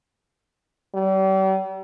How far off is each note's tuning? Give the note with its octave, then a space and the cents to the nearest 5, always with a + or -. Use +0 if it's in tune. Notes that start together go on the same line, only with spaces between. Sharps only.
G3 -40